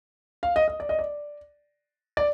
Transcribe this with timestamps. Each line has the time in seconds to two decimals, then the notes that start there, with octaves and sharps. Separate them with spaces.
0.43 F5
0.56 D#5
0.68 D#5
0.80 D5
0.89 D#5
0.99 D5
2.17 D5